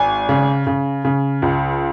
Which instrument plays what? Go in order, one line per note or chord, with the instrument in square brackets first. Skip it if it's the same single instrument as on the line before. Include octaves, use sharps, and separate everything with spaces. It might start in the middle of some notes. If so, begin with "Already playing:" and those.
Already playing: [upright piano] G#1 G#5
C#3
C#3
C#3
C#2